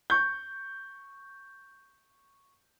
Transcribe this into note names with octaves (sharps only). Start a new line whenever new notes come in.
C#6 G6